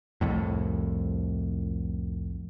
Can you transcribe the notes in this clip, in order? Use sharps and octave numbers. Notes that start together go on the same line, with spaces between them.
C2 F2 A2